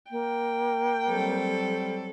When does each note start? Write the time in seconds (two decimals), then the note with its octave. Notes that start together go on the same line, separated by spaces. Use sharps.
0.11 A#3 G5
1.07 F#3 G3 C4 A4